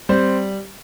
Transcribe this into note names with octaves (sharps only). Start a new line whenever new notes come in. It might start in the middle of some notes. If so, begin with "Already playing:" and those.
G3 C4 C5